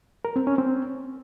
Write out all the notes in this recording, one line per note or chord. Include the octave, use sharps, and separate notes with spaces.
A#4
C4
C#4
C4